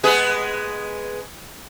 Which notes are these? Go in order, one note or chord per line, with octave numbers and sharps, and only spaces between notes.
G#3 B3 G#4